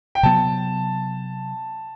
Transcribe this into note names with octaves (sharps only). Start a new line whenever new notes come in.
G5
C3 F#3 B3 A5